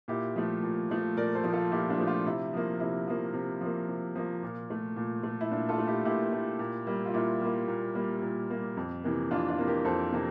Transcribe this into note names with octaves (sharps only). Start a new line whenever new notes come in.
A#2 E4 G4
F3 A3
A#2
F3 A3
A#2 A#4 D5
A4 C5
F3 A3
F4 A4
A#2 E4 G4
D4 F4
F3 A3
D4 F4
C3 E4
F3 A#3
C3 E4
F3 A#3
C3
F3 A#3
C3
F3 A#3
A#2
A3
A#2
A3
E4
A#2 D4
F4 A4
A3
E4 G4
A#2 E4 G4
A3
A#2
G3 A#3
F4
A#2 E4
G3 A#3
A#2
G3 A#3
A#2
G3 A#3
F2
C3 E3 A#3
F2 D4 F4
D4 F4
C3 E3 A#3
G4 A#4
F2 A4 C5
C3 E3 A#3